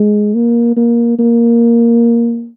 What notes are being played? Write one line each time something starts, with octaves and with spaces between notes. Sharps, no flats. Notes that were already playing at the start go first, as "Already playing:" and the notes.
Already playing: G#3
A#3
A#3
A#3